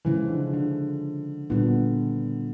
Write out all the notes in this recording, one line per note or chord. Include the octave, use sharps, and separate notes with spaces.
C#3 E3 F3 G#3
D3
D3
A#2 D3 G3 B3